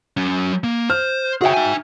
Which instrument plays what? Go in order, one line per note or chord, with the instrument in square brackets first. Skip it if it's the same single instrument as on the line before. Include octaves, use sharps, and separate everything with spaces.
[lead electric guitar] F#3 C#4
A#3
[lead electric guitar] C5 [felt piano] F6
[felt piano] F#4 E5 G5 [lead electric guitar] G#4 C#5
[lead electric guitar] D#4 G#5